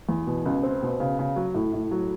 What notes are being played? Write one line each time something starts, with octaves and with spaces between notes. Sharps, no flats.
E2
B2
C#2
C4
B2
C#3
C#3
F#3
A2
A2
F#3